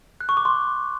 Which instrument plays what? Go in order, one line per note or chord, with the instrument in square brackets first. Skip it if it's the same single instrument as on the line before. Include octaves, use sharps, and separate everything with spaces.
[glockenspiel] F#6
C#6
D6
C6